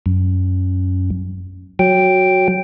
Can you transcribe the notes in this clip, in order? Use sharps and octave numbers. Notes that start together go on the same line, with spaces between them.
F#2
F#3 G5